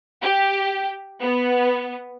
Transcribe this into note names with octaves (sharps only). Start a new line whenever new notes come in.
G4
B3